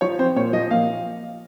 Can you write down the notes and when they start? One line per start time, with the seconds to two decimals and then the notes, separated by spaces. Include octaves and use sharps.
0.01 F3 C#5
0.19 C4 C5
0.36 A#2 C#5
0.53 F3 D#5
0.71 A#2 F5